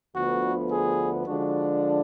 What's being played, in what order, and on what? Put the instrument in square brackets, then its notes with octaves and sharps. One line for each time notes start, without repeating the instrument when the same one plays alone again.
[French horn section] D2 D3 F3 B3 [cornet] F#4
[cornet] G#4
[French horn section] D3 F3 G#3 D4 [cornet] F#4